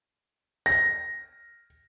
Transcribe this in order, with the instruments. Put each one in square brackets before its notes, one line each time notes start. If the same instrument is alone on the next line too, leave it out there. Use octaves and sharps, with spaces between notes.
[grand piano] A#6